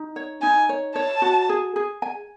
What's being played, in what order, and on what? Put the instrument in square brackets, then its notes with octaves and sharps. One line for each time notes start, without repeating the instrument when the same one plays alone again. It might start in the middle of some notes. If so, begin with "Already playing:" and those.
Already playing: [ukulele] D#4
C#5
[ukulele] D#4 [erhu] G#5
[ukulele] C#5
[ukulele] C#5 [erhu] A5
[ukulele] F#4
G#4
G#4
G#5